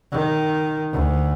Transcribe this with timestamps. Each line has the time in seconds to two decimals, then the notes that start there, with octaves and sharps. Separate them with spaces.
0.12 D#3
0.92 D2